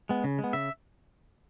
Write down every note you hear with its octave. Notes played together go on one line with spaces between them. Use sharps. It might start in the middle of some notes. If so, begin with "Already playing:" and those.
G#3 B3
C#3
G#3
B3
C#3 E5